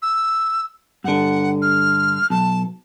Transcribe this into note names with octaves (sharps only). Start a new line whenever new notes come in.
E6
G2 D3 F#5
F6
B1 A5